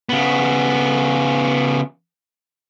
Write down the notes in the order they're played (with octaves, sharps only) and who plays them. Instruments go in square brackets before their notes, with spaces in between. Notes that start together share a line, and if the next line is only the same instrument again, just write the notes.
[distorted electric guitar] C#3 B3